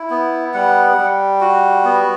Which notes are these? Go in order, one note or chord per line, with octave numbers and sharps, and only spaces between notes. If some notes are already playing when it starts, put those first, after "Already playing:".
Already playing: E4
B3
G3 F#5
G3
F#4
B3